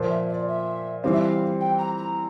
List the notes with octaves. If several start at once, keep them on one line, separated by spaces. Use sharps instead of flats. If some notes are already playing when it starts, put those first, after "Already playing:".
Already playing: A#2 F3 A#3 F4 C5
E5
D5
E5
E3 G3 C4 F5
E5
F5
G5
A#5
A#5